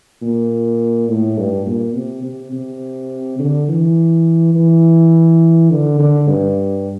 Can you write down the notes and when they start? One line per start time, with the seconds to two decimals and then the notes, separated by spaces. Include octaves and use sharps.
0.22 A#2
1.09 A2
1.38 G2
1.66 A#2
1.95 C3
2.23 C3
2.53 C3
3.39 D3
3.69 E3
4.55 E3
5.70 D3
5.99 D3
6.29 G2